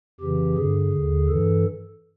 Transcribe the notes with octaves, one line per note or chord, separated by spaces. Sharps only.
F2 C#3 E3 G4
G2 D3 G#4
D#2 D3
G2 E3 A4